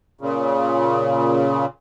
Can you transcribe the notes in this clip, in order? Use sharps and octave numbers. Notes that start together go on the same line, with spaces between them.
A#2 C#3